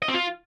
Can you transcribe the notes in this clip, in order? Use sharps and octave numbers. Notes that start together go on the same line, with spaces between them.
D#5
C4
F4